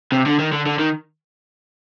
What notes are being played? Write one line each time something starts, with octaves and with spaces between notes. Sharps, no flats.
C3
D3
D#3
D3
D3
D#3